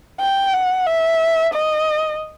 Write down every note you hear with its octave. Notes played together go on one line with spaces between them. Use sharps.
G5
F#5
E5
D#5